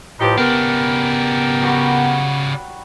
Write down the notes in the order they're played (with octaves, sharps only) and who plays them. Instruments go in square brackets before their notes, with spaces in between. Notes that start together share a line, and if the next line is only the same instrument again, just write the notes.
[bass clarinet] A2 [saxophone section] F3 D#4 G4 [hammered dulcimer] B4 C5
[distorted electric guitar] C#3 D4 [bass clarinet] B3 [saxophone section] G4 A#4
[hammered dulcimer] F#3 G3 F#4